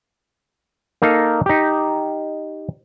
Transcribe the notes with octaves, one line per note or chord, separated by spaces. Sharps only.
A#3 D#4 A4 F5
D#4 G4